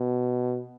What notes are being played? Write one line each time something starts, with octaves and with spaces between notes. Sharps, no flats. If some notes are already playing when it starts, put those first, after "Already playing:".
Already playing: B2